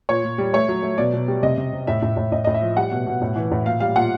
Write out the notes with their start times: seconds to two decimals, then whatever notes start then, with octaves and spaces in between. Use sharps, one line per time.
0.09 A#2 C#5
0.24 A#2
0.38 G3
0.53 A3 C#5
0.68 F#3
0.83 A3
0.98 B2 D5
1.13 B2
1.28 G3
1.42 C3 D#5
1.57 C3
1.73 C3
1.87 A2 E5
2.02 A2
2.17 A2
2.32 A2 D#5
2.44 A2 D#5
2.54 E5
2.62 F3
2.77 G3 F#5
2.91 B2
3.07 B2
3.22 A2
3.36 E3
3.51 A2
3.65 A#2 F5
3.80 G3 F5
3.95 A#2 F#5